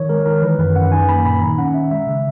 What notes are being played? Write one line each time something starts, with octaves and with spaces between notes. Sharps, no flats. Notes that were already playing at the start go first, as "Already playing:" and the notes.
Already playing: D#3 C#5
G#3 A#4
D#3 A#4
E3 B4
F#2 B4
F#2 F#5
D#4 G#5
A#3 B5
A#2 B5
D#3 A#5
C#4 F#5
C#4 E5
G#3 E5
C#3